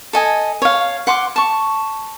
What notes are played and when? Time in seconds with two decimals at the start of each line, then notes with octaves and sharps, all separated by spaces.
0.13 A4 D#5 G#5
0.62 C#5 F5
1.07 F#5 C6 D6
1.36 A5 C#6